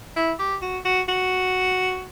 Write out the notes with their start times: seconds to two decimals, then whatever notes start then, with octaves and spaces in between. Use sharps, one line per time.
0.16 E4
0.39 G4
0.62 F#4
0.85 F#4
1.08 F#4